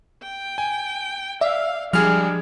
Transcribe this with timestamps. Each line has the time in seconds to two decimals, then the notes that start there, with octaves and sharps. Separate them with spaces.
0.23 G5
0.58 G#5
1.41 D5 E5 F5
1.93 F3 G3 G#3 D4 G#4 F6